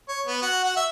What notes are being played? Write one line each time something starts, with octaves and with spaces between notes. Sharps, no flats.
C#5
B3
F#4
F#4
E5